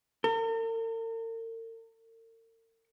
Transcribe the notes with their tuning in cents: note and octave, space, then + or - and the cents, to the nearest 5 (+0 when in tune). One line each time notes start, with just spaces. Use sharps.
A#4 -45